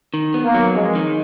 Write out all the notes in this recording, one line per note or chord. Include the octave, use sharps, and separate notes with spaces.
D#3
B3
A#3
F#3
F2 G#3
D#3